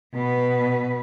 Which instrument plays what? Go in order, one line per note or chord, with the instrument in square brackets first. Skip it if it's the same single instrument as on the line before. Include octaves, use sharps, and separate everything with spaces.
[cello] B2 B4